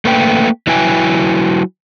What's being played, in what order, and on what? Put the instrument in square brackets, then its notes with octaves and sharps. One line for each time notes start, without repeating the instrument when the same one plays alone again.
[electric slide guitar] A3 A#3 B4 G5
F#3 E4 B4 G5 G#5